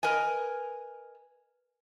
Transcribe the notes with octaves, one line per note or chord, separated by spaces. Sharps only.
A#4 B4 D#5 G#5